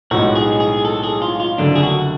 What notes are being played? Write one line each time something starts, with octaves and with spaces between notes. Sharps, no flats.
B1 A2 F3 G#3 F#4
G#4
G#4
A4
G#4
F4
F4
F#1 F2 D3 F#3 D4
G#4
F#4